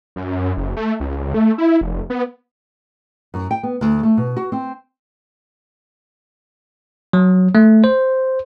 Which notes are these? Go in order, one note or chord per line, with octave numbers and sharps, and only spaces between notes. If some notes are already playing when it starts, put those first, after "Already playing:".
F#2
F#1
A3
C#2
A3
E4
F1
B3
F#2
G5
B3
D2
A3
B2
F#4
C4
F#3
A3
C5